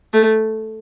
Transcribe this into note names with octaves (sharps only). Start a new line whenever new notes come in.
A3